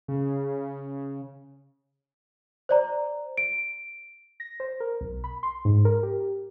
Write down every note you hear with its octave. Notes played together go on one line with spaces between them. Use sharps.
C#3
C5 D5 A#5
D7
A#6
C5
A#4
B1
B5
C6
G#2
A#4
G4